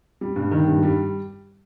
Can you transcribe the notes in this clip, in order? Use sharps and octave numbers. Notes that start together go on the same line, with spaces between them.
G3
G2
D#3
G2
G3